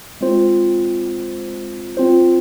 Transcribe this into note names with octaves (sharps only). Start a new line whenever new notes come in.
G#3 C4 F4 C5
C4 F4 C5